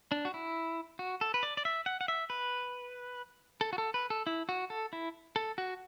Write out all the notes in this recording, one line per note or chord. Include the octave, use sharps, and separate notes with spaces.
D4
F#4
E4
F#4
A4
B4
D5
D5
E5
F#5
F#5
E5
B4
A4
F#4
A4
B4
A4
E4
F#4
A4
E4
A4
F#4